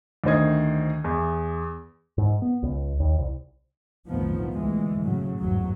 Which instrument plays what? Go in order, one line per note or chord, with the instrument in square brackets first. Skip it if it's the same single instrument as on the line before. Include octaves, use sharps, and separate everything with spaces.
[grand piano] D2 D3 D#3 C5 D#5 G#6
E2
[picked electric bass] G#2
B3
C#2
D#2
C2
[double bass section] B1 F2 A2 D#3 F3 B3
D2 E3 G#3
F#1 A2 C#3 F#3
G1 E2 G#2 F#3